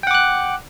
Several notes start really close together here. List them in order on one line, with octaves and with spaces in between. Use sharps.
G5 F#5 D6 F#6